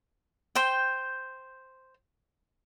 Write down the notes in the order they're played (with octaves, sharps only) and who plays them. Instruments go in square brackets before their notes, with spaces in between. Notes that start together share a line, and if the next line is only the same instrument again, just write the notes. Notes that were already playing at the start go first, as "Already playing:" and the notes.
[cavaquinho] C5 G5